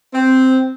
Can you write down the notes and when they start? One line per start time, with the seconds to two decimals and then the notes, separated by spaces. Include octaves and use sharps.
0.14 C4